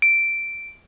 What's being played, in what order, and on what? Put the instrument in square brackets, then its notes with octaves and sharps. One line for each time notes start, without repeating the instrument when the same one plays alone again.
[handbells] D7